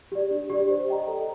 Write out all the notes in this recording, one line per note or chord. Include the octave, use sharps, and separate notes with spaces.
G4 D5
D4
G4 D5
C5
D#5 G5 A#5
A4